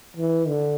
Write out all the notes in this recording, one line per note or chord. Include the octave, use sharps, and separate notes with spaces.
E3
D3